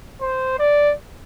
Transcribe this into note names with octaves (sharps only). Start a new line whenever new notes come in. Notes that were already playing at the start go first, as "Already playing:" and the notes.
C5
D5